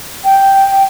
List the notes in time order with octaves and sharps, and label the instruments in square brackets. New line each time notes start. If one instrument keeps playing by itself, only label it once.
[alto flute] G5